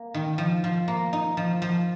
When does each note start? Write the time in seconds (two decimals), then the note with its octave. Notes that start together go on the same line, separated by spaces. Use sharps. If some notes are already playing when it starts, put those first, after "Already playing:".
Already playing: A#3
0.14 D#3
0.38 F3
0.64 F3
0.88 A#3
1.13 D#4
1.37 F3
1.62 F3